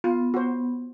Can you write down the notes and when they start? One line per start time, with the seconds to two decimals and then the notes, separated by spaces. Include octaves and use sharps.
0.04 B3 F4
0.34 F#4 C5